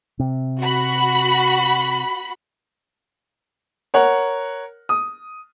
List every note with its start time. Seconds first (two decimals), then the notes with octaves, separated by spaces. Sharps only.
0.19 C3
0.60 F#4 B5
3.94 A#4 C#5 F#5
4.89 D#6